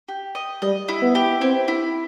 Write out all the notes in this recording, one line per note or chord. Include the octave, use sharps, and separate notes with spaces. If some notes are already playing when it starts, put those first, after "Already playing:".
G4
D#5
G3 D#5
E4
B3
G4
C4 E4
E4